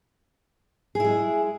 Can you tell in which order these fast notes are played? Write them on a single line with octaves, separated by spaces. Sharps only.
G#4 E4 G#3